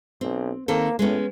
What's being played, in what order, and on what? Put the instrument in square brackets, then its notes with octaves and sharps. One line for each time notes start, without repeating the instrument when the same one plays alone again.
[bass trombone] B1 [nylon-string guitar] C4
[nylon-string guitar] D#3 C4 A4 [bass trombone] A#3
[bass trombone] A2 [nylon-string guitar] G#3 B3 C#4